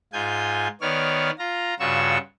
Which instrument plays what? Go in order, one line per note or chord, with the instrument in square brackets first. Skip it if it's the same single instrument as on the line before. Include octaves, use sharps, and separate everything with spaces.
[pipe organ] G#2 F4 G#5 G6
D#3 B3 C#5 D5 F6
F4 A#5
G2 C#3 F4 F#4 C#6 E6